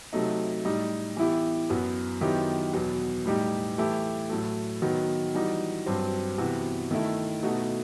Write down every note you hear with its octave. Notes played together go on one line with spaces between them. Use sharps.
C3 F#3 A3 D#4
A2 G3 D#4
E3 B3 E4 G4
F#2 F#3 B3
D#3 F#3 B3 E4 G4
E2 B2 F#3 B3
A2 G3 D#4 G4
E3 A3 E4 G4
A2 F#3 A3
D#3 F#3 B3 F#4
E3 G3 D#4 F#4
G2 F#3 C4
C3 E3 B3 F#4
D#3 A3 E4
B2 A3 D#4 F#4